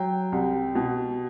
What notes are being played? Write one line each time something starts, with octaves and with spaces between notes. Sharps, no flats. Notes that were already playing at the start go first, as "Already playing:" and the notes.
Already playing: F#3 G5
C2
B2